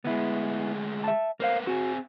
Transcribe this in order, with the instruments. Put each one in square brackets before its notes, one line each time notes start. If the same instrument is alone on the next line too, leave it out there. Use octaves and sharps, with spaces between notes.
[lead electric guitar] D2 G#3 [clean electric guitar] B3 E4
[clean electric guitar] E5 A5
[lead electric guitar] A#3 B3 [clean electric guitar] A#4 C5 F5
[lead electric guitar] C4 G#4 [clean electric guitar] F#4